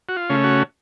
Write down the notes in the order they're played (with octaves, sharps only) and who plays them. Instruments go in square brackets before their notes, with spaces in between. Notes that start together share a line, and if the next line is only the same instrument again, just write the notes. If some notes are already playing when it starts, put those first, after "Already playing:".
[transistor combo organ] F#4
F4
C#3 A3 C#4
F#4